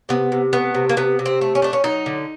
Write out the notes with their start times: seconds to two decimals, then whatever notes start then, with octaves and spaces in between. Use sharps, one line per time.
0.09 C3 B3
0.32 C3
0.53 A3 B3
0.75 C3
0.89 A#3
0.97 C3 B3
1.19 C3
1.26 C4
1.41 A3
1.55 C#4
1.62 A3 D4
1.73 C#4
1.84 F#3 D#4
2.06 D3